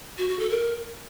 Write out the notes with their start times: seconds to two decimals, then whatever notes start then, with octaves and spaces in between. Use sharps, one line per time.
0.18 F#4
0.29 F#4
0.39 A4
0.50 A#4